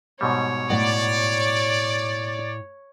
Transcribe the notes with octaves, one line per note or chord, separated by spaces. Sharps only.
G#2 B2 G3 C#5
A2 D5 F#5